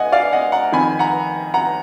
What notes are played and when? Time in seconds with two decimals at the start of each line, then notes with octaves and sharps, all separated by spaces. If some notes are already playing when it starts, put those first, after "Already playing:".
Already playing: D2 D#5 F#5 G#5
0.12 D5 F5
0.32 D#5 F#5
0.52 F#5 A#5
0.72 F2 D#3 G#5 B5
0.99 F#5 A#5
1.54 F#5 A#5